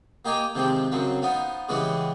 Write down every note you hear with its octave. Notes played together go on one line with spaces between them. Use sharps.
A#3 G4 D#5 G5 G#5 A#5
C3 D#3 F3 G#3 C4 G4
F#2 C#3 F#3 C4
F3 B3 D#4 F4
C#3 E3 G3 G#3 B3 C#4